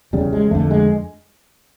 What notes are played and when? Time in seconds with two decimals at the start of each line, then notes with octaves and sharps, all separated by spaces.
0.13 E2 C#3 G3
0.33 G#3
0.51 F2 D3 A3
0.71 G#3